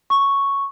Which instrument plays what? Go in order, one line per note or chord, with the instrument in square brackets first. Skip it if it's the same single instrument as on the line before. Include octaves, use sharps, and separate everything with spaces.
[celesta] C#6